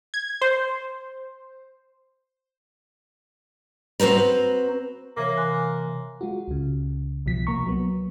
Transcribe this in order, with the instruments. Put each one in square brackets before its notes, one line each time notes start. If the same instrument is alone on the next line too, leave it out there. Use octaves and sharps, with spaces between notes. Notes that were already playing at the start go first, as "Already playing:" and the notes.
[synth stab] G#6
C5
[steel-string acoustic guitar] C4 F#4 B4 C5 A#5
[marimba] C3 E3 C#5 [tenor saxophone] A#3
[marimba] G#5 C6 F#6
[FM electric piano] G#3 F4 F#4
C#2 C#3
C2 B2 F3 B6
C2 A#3 A#5 C#6
F#3 B3